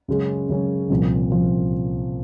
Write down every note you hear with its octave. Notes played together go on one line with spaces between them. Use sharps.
F#2 C#3 G#3 C#4
F#2 C#3 G#3 C#4
C2 A#2 F3
F3